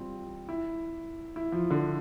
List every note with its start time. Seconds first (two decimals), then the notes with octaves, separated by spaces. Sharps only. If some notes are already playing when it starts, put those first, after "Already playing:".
Already playing: G3 C4 F4
0.49 E4
1.36 E4
1.52 F3
1.71 D3